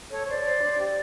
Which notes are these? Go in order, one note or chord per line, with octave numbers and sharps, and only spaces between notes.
A4 C#5
C5 D5
C5
D4
G4